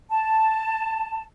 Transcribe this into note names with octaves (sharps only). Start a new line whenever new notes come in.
A5